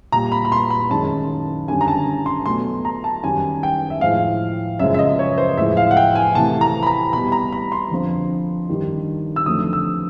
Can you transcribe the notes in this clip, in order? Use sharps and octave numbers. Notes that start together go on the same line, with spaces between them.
A#2 G3 A#5
B5
B5
C6
B5
F#2 D#3 G#3 A5
F#2 D3 G3 G#5
A#5
A5
C6
B2 F#3 A3 C6
A#5
A5
F#2 D#3 G3 G#5
G5
E5
A2 F3 G#3 F5
F#2 C#3 F3 G#3 E5
E5
D#5
C#5
C5
A2 F3 G#3 E5
F5
F#5
G5
G#5
C3 E3 A3 A5
A#5
B5
A#5
B2 G3 B5
A#5
B5
C6
F2 D3 F3
G2 D#3 G3
E6
F2 D3 F#3 A3 D#6
E6